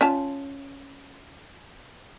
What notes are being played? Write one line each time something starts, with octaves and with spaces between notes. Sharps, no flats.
C#4 F4 A5